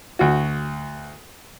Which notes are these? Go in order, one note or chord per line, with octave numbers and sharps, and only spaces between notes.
D2 F#4